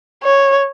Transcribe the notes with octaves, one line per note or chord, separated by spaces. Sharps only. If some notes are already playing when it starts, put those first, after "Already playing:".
C#5